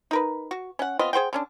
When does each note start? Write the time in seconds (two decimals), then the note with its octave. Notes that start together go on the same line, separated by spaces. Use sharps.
0.11 D#4 A#4 B4
0.51 F#4
0.79 C#4 F#5
0.99 B3 C4 F4 D#5
1.13 G#4 C5 F#5 G5
1.33 D3 C#4 D4